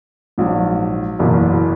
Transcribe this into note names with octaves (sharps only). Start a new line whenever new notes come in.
A#1 G#2 F#3
F#1 E2 B2 A#3